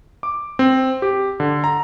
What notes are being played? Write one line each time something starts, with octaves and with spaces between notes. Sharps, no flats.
D6
C4
G4
D3
A#5